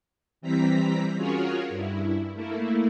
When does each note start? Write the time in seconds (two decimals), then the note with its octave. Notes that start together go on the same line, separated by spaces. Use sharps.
0.41 E3 G3 C4 A#5 B6
1.16 C#4 F4 F#4 G#4 A#4 C#5
1.69 G2 E4
2.33 A3 A#3 E4